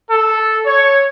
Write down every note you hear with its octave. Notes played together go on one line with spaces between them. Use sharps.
A4
C#5